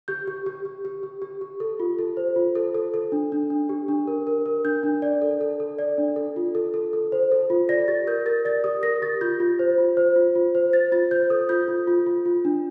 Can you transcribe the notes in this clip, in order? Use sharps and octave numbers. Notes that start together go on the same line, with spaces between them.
G4 G6
G4
G4
G4
G4
G4
G4
G4
A4
F4
A4
C5
F4
A4
A4
A4
D4
D4
D4
G4
D4
A#4
A#4
A#4
D4 G6
D4
D5
A4
A4
A4
D5
D4
A4
F4
A4
A4
A4
C5
A4
F4
D5 A#6
G4 A6
A#4 G6
A#4 A6
D5 A6
G4 D#6
A#4 A#6
G4 A6
F4 G6
F4
C5
F4
C5
F4
F4
C5
C5 A6
F4 A6
C5 G6
A4 D#6
F4 G6
F4
F4
F4
F4
D4